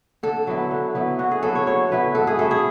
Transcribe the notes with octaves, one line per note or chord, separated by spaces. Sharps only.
D3 A4
F#3 B3 E4
D3
F#3 B3 E4
D3 F#4
G#4
F#3 B3 E4 A4
C#5
D3 C#5
F#3 B3 E4 B4
G#2 A4
G#4
F#3 C#4 E4 A4
G#4